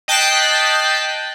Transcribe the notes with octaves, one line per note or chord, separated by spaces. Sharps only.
D#5 G5 A5 F#6 B6 C7